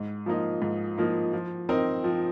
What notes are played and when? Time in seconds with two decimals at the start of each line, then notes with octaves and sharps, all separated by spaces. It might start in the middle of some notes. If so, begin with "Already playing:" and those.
Already playing: G#2
0.26 F3 A#3 D#4
0.62 G#2
0.98 F3 A#3 D#4
1.33 F3
1.69 C4 D#4 A#4
2.04 F3